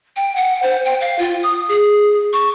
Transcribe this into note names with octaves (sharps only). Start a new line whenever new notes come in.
G5
F#5
C5
G5
F5
F4
D#6
G#4
C#6